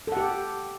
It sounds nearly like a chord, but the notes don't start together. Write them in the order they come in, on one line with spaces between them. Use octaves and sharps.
A4 F#5 G4